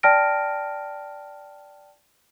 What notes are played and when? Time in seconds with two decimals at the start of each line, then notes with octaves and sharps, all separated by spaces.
0.03 D5 G5 A5 F6 A#6 D7